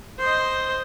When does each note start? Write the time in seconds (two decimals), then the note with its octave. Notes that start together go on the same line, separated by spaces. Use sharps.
0.19 C5 D#5